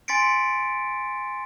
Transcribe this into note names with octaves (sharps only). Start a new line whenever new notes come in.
G#5 C6 A6 B6 C#7 D7